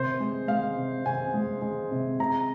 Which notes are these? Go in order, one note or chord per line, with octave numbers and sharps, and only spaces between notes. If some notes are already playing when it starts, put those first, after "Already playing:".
Already playing: C3 C5
G#3
G#3 F5
C3
C3 G#5
G#3
G#3
C3
G#3 A#5